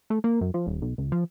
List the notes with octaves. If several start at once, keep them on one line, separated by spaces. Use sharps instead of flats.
A3
A#3
F#2
F3
D#1
B1
C#2
F3